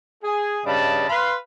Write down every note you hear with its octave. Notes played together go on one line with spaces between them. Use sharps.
G#4
G2 C#3 D5 D#5 A5 B5
B4 F5 B5 C6